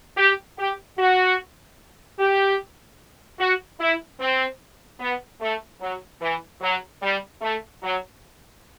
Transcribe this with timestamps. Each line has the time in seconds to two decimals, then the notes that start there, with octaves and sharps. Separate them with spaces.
0.17 G4
0.58 G4
0.98 F#4
2.18 G4
3.40 F#4
3.80 E4
4.20 C4
5.00 B3
5.41 A3
5.81 F#3
6.21 E3
6.61 F#3
7.02 G3
7.41 A3
7.82 F#3